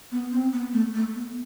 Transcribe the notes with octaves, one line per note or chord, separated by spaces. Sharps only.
B3
C4
B3
A3
A3
B3